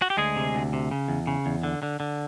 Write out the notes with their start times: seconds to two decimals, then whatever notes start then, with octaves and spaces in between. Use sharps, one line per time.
0.02 F#4
0.10 G4
0.17 D2 G#3 G#4
0.36 C3
0.55 D2
0.73 C3
0.91 C#3
1.08 E2
1.27 C#3
1.46 E2
1.63 D3
1.83 D3
2.00 D3